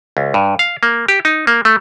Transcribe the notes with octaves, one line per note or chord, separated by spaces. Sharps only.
C#2
G2
F5
A#3
G4
D#4
A#3
A3